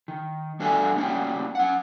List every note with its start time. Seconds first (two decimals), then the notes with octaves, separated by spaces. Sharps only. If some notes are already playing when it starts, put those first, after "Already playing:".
0.08 D#3
0.60 G3 D4 F#4 A4 E5 G#5
0.96 G3 A#3 C#4 D#4 F#4 G4
1.55 C#4 F#5